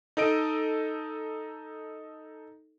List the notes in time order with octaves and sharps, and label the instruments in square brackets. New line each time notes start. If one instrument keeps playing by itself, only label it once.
[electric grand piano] D#4 A4 D#5 D7